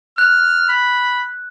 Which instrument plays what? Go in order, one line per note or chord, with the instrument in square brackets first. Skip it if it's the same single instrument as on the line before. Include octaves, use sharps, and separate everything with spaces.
[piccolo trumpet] F6 [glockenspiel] F#6
[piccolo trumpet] B5